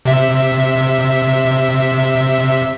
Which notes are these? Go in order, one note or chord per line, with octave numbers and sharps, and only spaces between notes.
C3 E5